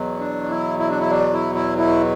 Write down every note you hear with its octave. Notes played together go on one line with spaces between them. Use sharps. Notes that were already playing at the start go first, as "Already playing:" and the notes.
Already playing: E2 B2 F#3
D4
E4
E4
D4
E4
D4
E4
E4
E4